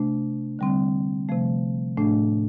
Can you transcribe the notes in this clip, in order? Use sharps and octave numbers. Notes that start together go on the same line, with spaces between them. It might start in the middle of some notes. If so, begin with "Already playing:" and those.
Already playing: C3 A3 D4
D3 G3 C4
C3 F3 A3
A2 A3 D4